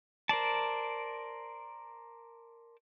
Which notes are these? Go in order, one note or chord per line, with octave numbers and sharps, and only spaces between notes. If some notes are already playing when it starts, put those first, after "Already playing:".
A#4 C5 D5 A5